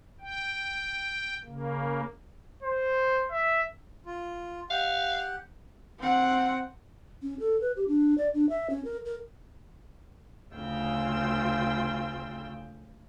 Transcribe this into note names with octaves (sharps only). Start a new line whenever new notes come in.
G5
C#3 A#3
C5
E5
F4
G4 F5 F#5
C4 F#5
C#4
A4
B4
G4
D4
D5
D4
E5
C#4
A#4
A#4
D2 C#3 F4 G5 E6